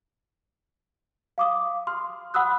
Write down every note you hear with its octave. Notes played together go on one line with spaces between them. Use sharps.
F5 D6 D#6
C6 F6
F#5 B5 D#6 E6 F#6